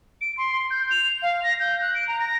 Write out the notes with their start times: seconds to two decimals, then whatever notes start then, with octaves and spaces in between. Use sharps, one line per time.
0.21 D7
0.37 C6
0.70 G6
0.90 F7
1.22 F5
1.43 A#6
1.59 G6
1.81 F#6
1.94 D7
2.07 A#5
2.20 A#6